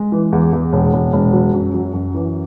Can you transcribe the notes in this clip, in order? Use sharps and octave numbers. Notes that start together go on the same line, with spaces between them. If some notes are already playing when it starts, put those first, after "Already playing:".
Already playing: G#3
E3
E2
E2
E1
E1
E1
F#3
F#2
F#3
F#2
E3